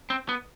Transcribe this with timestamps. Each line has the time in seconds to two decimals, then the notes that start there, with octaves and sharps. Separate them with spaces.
0.10 C4
0.29 B3